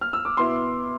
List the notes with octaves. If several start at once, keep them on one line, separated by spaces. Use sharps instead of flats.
F6
E6
D6
B2 B3 E4 C6